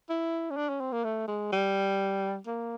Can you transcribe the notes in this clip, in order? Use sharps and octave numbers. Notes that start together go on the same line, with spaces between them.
E4
C#4
D4
C#4
C4
A#3
A3
G#3
G3
A#3